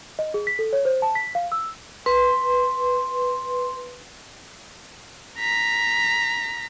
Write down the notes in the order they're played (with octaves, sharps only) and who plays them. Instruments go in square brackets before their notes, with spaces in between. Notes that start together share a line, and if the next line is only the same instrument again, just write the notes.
[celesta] D#5
G#4
B6
A4
C#5
C5
A5
B6
F5
E6
[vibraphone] B4 C6
[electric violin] A#5 B6